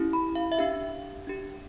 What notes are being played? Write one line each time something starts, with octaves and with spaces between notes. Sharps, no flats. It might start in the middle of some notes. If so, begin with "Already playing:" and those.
Already playing: C#4 E4 G4
B5
F5
E5
D4 G4 F5
D4 G4